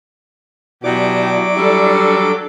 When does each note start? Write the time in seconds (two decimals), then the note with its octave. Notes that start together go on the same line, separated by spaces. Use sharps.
0.84 B2 F#3 E4 G4 D5 D6
1.57 G3 D4 A4